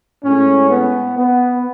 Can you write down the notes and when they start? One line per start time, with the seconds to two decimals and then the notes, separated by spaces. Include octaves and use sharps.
0.24 A2 G#3 C#4
0.71 B3
1.18 B3